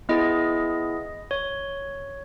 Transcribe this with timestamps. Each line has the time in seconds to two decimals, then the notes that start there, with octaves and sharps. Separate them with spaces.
0.09 B3 E4 G#4 D#5
1.31 C#5